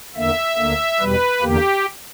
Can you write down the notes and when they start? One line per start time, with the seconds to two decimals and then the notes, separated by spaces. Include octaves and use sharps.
0.16 E2 D3 A#3 E5
0.58 D2 D3 A#3
1.00 E2 B2 G3 B4
1.42 E2 D3 A#3 G4